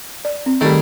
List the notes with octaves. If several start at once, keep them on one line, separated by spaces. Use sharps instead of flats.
D5
C4
D#3 G3 A3 G#4